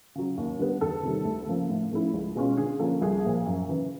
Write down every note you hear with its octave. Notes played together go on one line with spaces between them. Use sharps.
C#3 F#3
D#2
D3 G3 B3
E2 A4
C3 D#3 G3
D2
C#3 F3 A#3
A2
F3 A3 C#4 E4
C#2
B2 G#3 C#4 F4
D3 G#4
F3 A#3 C#4 F4 A4
C2 G#4
A#2 F3
F#2
C#3 E3